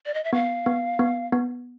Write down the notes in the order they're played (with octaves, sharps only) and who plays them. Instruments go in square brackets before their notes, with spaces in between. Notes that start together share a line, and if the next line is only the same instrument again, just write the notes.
[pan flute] D5
D#5
E5
[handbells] B3 [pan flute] F5
[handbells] B3
B3
B3